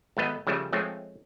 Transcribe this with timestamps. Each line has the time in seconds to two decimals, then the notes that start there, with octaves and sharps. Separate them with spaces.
0.17 G#1 A3 B3 D#5
0.47 C#3 F3 G3 A3
0.73 F3 G#3 A3 C4 C#5